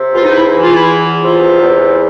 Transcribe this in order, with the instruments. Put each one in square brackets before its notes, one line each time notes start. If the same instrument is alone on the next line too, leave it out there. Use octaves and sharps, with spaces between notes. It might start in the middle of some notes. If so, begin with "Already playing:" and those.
Already playing: [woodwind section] C3
E2 F4
D#4
E4
E3 E4
F4
E4
E2
C3 F4
E2